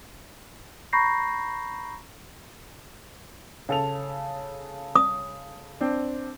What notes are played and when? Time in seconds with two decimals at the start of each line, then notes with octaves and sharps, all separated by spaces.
0.93 A#5 B5 C#6 G6 A#6 C7
3.69 C#3 A4 F7
4.96 D#6
5.81 C4 D4